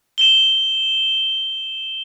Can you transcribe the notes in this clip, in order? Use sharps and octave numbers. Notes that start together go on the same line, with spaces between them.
E7 G7